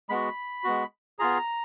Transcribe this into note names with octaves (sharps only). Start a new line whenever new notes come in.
G#3 B3 F#4 B5
G#3 B3 F#4
B3 F4 G#4 A#5